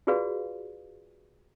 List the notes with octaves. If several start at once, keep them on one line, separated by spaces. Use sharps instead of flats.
F4 F#4 G#4 B4 D5 F5